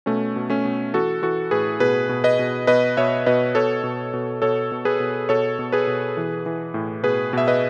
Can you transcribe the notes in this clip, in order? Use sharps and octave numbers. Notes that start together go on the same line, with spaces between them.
B2 A3 C#4
B2
A3 C#4
B2
E3 F#4 A4
E3 F#4 A4
A2 G#4 B4
B2 G#4 B4
B2
B4 D#5
B2
B2 B4 D#5
B2 C#5 E5
B2 B4 D#5
B2 A4 C#5
B2
B2
B2 A4 C#5
B2
G#4 B4
B2
B2 A4 C#5
B2
G#4 B4
B2
E3
E3
A2
B2 G#4 B4
B2 E5
B4 D#5